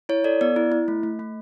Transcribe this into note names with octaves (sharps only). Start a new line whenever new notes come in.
E4 C#5
A4 D5
B3 D5
E4
E4
A3
A3
A3